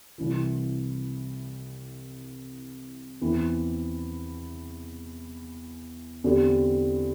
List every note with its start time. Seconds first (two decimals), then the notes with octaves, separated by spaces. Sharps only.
0.18 C2 C3 E3
3.21 E2 E3 C4
6.24 E2 D3 C4 G4